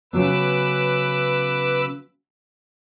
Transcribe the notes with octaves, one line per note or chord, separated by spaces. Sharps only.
C#3 F#3 B3 B4 D6 E6